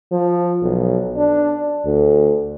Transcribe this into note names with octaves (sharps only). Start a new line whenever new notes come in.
F3
B1
D4
D2